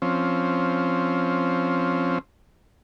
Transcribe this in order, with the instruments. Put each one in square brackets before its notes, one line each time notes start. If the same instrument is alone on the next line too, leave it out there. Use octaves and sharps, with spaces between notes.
[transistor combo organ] F3 C4 C#4